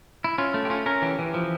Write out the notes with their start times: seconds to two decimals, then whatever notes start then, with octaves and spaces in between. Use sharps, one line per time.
0.24 E4
0.38 C#4 F4
0.54 A3
0.65 G4
0.70 C#4 F4
0.86 C#4 A#4
1.02 E3 G4
1.19 E3
1.34 F3